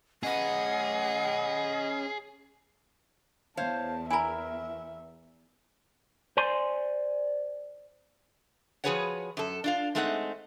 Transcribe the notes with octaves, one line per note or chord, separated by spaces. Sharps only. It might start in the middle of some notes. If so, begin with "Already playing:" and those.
C#4 G#4 B4 D#5 F#5
E2 C5 C#5 F5 A5
E4 A#4 E5 G#5 A#5
C5 D5 G#5 C6
F3 F#4 G#4 B4 C#5 F#5
F#2 A4
D4 F4 F5
G#3 A3 C4 D#4 C5 F#5